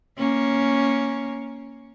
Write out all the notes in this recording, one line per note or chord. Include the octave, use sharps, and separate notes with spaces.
A#3 C#4